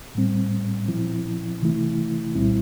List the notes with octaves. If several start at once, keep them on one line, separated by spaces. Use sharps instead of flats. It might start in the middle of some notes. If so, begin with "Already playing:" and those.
A2 G3 C4
A#2 F3 C4 E4
C3 E3 A3 E4
C2 A#2 G3 C4 E4